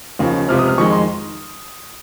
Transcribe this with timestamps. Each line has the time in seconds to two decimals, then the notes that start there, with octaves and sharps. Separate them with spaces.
0.19 D#2 C#3 F3
0.48 C#2 C3 F3 F6
0.59 D#6
0.68 F6
0.78 F2 D#3 G#3 C#6
0.93 C6